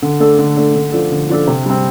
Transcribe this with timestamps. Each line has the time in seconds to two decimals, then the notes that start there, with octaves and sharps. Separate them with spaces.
0.02 D3
0.20 A3 D4 A4
0.39 D3
0.57 A3 D4 A4
0.75 D3
0.92 F3 D4 A4
1.11 D3
1.29 F3 D4 A4
1.47 C3
1.66 G3 C4